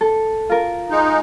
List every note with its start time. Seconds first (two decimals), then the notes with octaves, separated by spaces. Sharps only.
0.01 A4
0.49 F4 A#4
0.90 G#3 D#4